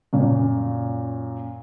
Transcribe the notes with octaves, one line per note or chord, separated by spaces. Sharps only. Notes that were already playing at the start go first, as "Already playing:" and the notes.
F#2 A#2